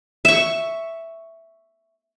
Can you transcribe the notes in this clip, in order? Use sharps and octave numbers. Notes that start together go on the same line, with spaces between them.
E5 C#6